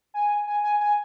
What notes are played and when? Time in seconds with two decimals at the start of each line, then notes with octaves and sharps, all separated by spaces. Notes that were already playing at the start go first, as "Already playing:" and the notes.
0.14 G#5
0.47 G#5
0.64 G#5
0.80 G#5